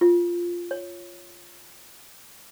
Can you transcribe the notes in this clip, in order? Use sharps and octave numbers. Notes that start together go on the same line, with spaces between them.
F4
C#5